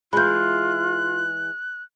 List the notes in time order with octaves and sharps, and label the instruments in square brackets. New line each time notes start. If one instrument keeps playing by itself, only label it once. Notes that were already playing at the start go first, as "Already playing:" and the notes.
[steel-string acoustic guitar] E3 G#3 [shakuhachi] F4 [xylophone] B5 G6 [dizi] F#6